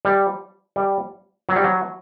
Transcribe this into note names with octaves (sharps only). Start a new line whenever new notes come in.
G3
G3
F#3
G3
F#3